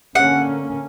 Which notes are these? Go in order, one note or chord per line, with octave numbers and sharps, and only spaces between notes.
D3 A#3 C#4 F#5